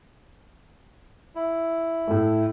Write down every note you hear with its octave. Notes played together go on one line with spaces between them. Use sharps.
E4
A2 A3